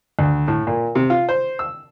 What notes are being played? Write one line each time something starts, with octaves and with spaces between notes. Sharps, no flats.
D2
A2
A#2
C3
F4
C5
E6